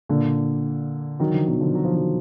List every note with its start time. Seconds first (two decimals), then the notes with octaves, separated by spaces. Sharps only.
0.09 A#2 D3
1.19 D#3 F#3
1.33 D3 F3
1.48 B2 D#3
1.61 D3 F3
1.75 F#3
1.84 F3
1.93 D#3 F#3